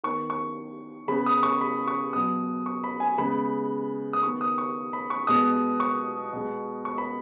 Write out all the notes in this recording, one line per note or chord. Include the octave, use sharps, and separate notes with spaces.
D#3 B3 C#6
C#6
C#3 B3 B5
D#6
C#6
B5
C#6
B2 F#3 B3 D#6
C#6
B5
G#5
C#3 G#3 B3 B5
D#6
D#3 B3 C#6
D#6
C#6
B5
C#6
B2 G#3 B3 D#6
C#6
B2 G#3 B3
C#6
B5